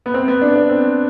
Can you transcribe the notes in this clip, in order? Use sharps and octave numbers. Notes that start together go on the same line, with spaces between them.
B3
C4
B3
D4
D4
C4